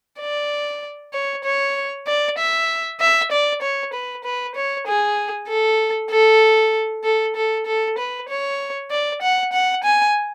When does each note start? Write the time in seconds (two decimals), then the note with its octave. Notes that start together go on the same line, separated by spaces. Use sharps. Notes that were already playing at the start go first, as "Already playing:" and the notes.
0.20 D5
1.14 C#5
1.45 C#5
2.07 D5
2.38 E5
3.00 E5
3.32 D5
3.62 C#5
3.94 B4
4.24 B4
4.56 C#5
4.87 G#4
5.49 A4
6.11 A4
7.04 A4
7.36 A4
7.66 A4
7.98 B4
8.29 C#5
8.91 D5
9.22 F#5
9.53 F#5
9.84 G#5